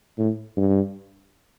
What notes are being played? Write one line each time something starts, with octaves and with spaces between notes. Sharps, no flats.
A2
G2